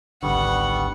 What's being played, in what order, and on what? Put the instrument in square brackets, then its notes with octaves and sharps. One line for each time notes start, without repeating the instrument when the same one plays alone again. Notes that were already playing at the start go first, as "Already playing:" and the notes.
[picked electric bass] G#1 C#2 D3 [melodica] G3 B3 C#6 [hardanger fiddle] F#5